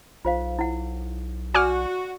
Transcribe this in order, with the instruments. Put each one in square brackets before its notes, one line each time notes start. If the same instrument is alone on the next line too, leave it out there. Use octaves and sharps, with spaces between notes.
[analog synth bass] B1 [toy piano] F4 C5 F5
[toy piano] E4 F#5
[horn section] F#4 [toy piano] D5 [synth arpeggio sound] G#5 D6 F6